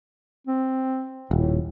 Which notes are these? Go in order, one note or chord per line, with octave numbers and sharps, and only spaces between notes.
C4
D#1 A2